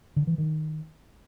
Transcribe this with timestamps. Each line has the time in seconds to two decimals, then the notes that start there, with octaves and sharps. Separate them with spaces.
0.16 D3
0.27 E3
0.38 D#3